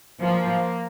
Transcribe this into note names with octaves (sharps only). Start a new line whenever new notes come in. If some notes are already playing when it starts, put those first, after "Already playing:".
F3 A#3